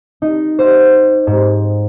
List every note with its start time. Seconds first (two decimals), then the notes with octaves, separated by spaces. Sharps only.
0.22 D#4
0.59 C5
1.27 G#2